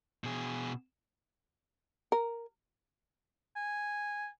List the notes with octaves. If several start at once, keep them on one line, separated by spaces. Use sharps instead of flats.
B2 G#4
A#4
G#5